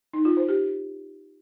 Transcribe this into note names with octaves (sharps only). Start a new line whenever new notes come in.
D#4
F4
C5
G4